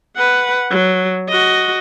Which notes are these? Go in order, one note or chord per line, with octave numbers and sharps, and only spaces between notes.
B4 F#5
F#3
F#4 D#5